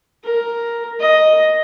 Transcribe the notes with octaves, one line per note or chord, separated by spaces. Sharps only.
A#4
D#5